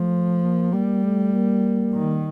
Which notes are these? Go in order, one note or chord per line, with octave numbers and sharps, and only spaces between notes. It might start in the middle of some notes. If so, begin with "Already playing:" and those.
Already playing: F3 A3
A#3
G3 A#3
A3
A#3
D#3